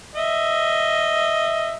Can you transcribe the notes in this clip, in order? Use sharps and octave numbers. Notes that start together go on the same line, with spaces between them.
D#5 E5